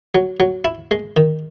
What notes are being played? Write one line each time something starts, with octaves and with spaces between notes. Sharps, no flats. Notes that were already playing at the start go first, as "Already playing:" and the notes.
F#3
F#3
E4
G#3
D#3